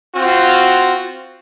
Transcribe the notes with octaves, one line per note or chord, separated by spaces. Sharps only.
C4 F4 F#4